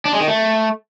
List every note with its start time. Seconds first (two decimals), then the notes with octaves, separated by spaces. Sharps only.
0.05 D4
0.13 G#3
0.20 D#3
0.28 A3